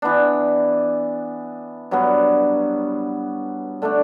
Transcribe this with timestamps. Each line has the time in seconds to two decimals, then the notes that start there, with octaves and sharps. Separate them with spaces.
0.02 E3 B3 D4
1.91 G2 F#3 B3 F#4
3.82 D3 A3 D4